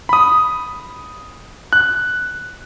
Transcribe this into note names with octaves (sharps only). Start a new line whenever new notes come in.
B5 D#6
F#6